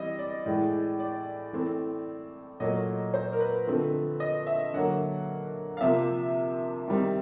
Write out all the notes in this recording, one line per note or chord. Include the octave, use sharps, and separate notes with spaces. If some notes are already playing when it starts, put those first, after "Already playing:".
Already playing: E3 G3 C4 D#5
D5
A2 E3 G#3
D5
E3 A3 C4
A#2 F#3 A3 D#5
C5
A#4
B4
D3 F3 A3 C4
D#5
E5
D3 F#3 A#3 F#5
F5
C3 F3 A#3 E5
D#3 G3 C4